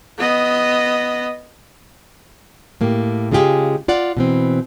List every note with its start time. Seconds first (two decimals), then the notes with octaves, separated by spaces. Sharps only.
0.18 B3 D#5
2.81 A2 A#3 G4
3.31 C#3 G#3 F4 G4 G#4
3.88 F4 D5 F#5
4.17 B2 E3 C4